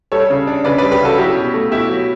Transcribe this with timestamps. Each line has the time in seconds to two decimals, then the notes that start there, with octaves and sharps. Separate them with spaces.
0.12 G3 A4 C#5
0.30 C#3
0.47 D4
0.64 C#3 B4 D5
0.78 G3 B4 D5
0.92 G4 B4
1.01 C#3 F#4 A4
1.18 F#3 E4 G4
1.36 B2
1.54 A3
1.71 B2 E4 G4
1.89 F#3